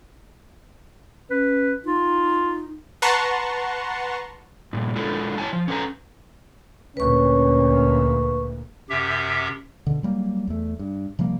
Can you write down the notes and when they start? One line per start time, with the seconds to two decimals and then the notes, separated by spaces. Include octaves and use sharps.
1.30 C#4 B4
1.85 D#4 F4
3.02 B4 F#5 A5 A#5 C6 C#6
4.73 G2 A#2
4.96 G#3 D4 E4 F4 A4
5.38 E4 C#5 G#5 A5
5.53 F3
5.68 C#4 A4 B4 F5 G#5 A#5
6.97 D2 A#2 C#4 B4 C#6
8.90 F#2 C3 G4 E5
9.87 B2 D3
10.03 F#3 G3 A#3
10.47 E2 A3
10.79 G2
11.19 C3 F3 G3 A#3